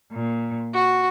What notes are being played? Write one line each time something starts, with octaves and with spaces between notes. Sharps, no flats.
A#2
F#4